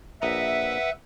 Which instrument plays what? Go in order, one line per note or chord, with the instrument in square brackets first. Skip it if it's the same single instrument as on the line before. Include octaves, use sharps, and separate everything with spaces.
[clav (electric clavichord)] A#1 D#5 A#5 [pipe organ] B4 F#5 [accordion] E5